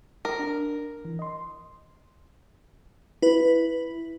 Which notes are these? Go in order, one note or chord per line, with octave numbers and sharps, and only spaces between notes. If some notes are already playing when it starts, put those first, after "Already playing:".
A#4
D4
E3
D#5 C6
E4 B4